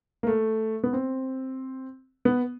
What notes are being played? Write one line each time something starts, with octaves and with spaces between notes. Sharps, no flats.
A#3
A3
B3
C4
B3